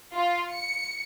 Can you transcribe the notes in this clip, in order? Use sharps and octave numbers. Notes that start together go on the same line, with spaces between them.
F4
C#7